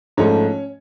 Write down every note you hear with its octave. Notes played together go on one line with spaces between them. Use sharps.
G#2 F3 A3 C#4 C#5